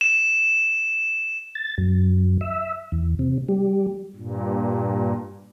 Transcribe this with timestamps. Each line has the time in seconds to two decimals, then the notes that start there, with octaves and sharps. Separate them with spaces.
0.01 E7
1.55 A6
1.78 F#2
2.41 E5
2.92 E2
3.19 C3
3.49 G3
4.16 G2 A#2